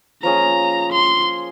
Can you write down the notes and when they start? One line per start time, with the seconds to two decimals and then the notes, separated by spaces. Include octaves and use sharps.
0.23 F3 A#3 C#4 G#4 A#5
0.92 C6